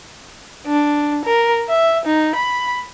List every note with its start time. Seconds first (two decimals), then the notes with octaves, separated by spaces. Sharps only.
0.66 D4
1.25 A#4
1.69 E5
2.06 D#4
2.36 B5